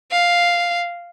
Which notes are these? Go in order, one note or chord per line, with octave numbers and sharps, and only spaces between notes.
F5